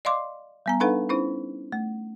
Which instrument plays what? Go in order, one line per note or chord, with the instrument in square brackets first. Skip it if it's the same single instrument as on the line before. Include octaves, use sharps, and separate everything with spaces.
[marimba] D5 D#5 F5 C6 D6
G3 B3 A#5
D4 D#4 A4 B4 F5 F#5
C#4 D#4 E4 C5
A3